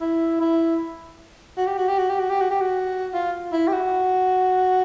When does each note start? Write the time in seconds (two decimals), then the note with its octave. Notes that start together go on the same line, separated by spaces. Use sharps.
0.01 E4
0.40 E4
1.57 F#4
1.67 G4
1.78 F#4
1.88 G4
1.98 F#4
2.09 G4
2.19 F#4
2.30 G4
2.40 F#4
2.51 G4
2.61 F#4
3.14 F4
3.52 E4
3.68 G4
3.73 F#4